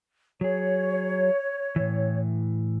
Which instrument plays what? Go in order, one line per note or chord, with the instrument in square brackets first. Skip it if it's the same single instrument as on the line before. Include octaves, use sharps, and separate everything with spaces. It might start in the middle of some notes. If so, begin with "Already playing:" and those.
[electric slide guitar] F#3 G#4 [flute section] C#5
[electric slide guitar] A2 E3